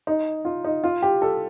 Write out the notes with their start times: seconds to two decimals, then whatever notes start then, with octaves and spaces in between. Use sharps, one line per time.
0.07 D#4
0.45 F4
0.65 D#4
0.84 F4
1.02 G4
1.22 A4